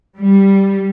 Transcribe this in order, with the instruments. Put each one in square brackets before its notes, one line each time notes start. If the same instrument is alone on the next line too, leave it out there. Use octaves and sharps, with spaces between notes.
[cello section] G3